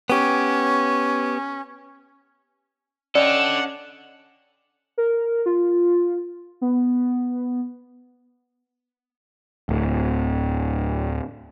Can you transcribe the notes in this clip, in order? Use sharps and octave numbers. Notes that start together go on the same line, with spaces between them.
B3 C#4 G4
C#4 D4 A4 D5 D#5 F#5 G5
A#4
F4
B3
D1 D2